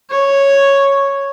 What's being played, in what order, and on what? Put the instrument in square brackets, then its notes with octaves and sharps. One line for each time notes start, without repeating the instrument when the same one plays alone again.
[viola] C#5